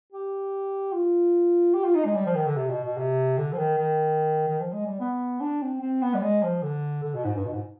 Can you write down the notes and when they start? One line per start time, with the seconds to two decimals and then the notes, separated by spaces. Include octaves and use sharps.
0.12 G4
0.93 F4
1.74 G4
1.84 F4
1.95 D#4
2.05 G#3
2.15 G3
2.26 F3
2.35 D#3
2.47 D3
2.56 C3
2.70 B2
2.83 B2
2.97 C3
3.38 D3
3.53 F3
3.58 D#3
3.78 D#3
4.49 D#3
4.60 F3
4.73 G#3
4.86 G3
5.00 B3
5.41 D4
5.62 C4
5.81 C4
6.02 B3
6.14 G3
6.22 G#3
6.43 F3
6.63 D3
7.04 D3
7.14 B2
7.24 G#2
7.35 G2
7.45 B2
7.53 G#2